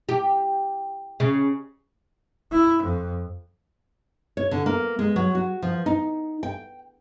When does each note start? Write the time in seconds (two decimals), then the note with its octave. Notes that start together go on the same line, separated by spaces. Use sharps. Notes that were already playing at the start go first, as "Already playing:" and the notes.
0.09 G4
1.20 C#3
2.52 E4
2.84 F2
4.37 C#5
4.51 D3
4.66 A#3
4.99 G#3
5.16 F#3
5.35 F#4
5.62 F3
5.86 D#4
6.43 G5